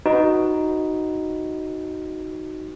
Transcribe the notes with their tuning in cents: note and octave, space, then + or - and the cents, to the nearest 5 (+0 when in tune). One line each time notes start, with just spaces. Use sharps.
D#4 +0 F#4 +0 B4 +10